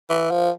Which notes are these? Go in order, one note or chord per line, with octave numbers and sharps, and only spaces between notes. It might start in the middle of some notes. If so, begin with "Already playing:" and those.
E3
F3